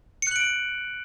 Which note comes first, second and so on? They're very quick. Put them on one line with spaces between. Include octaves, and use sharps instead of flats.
C#7 F#6 F#7 D7